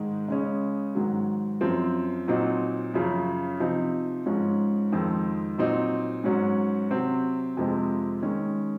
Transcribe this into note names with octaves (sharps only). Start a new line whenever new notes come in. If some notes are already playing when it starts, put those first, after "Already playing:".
Already playing: G#2 D#3 G#3
C#3 G#3 C#4
G#2 D#3 F#3
F#2 F3 C4
A#2 F#3 C4 D#4
F#2 C#3 F3
C3 F3 C4 D#4
G#2 F3 G#3 C#4
F2 D#3 G#3 C4 D#4
A#2 F#3 C4 D#4
G#2 F#3 C#4
C3 F#3 C4
F2 C3 F3 G#3 C4
D#3 G#3 C#4